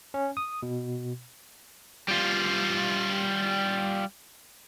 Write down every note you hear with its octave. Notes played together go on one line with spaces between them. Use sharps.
C#4
D#6
B2
G3 F4